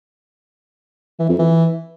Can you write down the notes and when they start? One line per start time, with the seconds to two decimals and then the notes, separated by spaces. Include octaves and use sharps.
1.19 E3
1.29 F2
1.39 E3